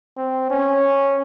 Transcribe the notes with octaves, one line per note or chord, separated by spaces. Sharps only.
C4
C#4